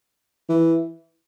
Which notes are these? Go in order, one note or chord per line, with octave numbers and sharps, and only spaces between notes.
E3